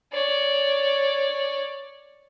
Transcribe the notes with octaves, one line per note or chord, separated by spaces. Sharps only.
C#5 D5